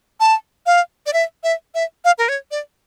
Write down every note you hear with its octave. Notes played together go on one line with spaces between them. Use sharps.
A5
F5
D5
E5
E5
E5
F5
A#4
C#5
D5